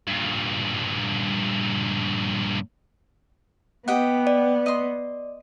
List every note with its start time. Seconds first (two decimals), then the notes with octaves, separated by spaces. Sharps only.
0.08 G2 A#2
3.88 B3 G4 D#5 F#5
4.27 D5
4.66 D#5 C6